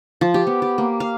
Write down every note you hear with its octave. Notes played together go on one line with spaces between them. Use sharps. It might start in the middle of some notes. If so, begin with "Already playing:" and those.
F3
G4
B3
G4
A#3
F5